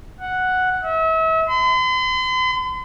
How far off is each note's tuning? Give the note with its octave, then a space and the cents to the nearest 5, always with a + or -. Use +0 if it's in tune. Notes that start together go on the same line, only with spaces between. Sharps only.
F#5 +0
E5 -35
C6 -45